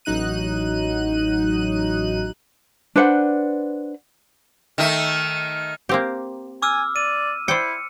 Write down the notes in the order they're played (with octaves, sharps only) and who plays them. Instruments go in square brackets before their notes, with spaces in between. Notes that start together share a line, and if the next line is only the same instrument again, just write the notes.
[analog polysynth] A1 F#3 D#4 F#6 D#7
[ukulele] D4 B4 C5 F#5
[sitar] D#3 A3
[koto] A#3 C4 G4
[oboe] G#5 [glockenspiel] D6 E6 F6
[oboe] D5 [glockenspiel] D#7
[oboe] E4 [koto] C5 D5 G5 [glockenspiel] C#7